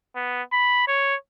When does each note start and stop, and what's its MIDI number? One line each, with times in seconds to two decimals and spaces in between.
0.16 0.42 59
0.53 0.85 83
0.88 1.15 73